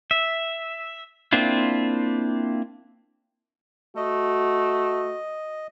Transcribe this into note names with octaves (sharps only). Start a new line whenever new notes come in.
E5
A#3 C4 D4 E4 F4
A3 F#4 D#5